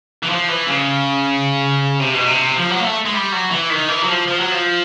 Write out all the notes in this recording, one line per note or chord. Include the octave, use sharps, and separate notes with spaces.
E3
F3
E3
C#3
C3
B2
C3
F3
F#3
A#3
A3
G#3
G3
F#3
E3
D#3
E3
F#3
F3
F3
F#3
F3